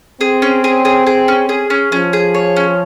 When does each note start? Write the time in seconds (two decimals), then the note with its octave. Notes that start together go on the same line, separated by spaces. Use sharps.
0.21 C4 G#4
0.42 C#4
0.64 G#4
0.85 G#4
1.07 G#4
1.28 C#4
1.49 G#4
1.70 C#4
1.92 F3 C#4
2.13 G#4
2.35 C#5
2.56 C#4